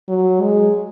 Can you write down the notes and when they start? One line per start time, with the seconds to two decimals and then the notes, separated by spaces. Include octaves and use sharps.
0.08 F#3
0.42 G#3